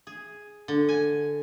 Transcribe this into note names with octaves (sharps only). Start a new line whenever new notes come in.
G#4
D3
G#5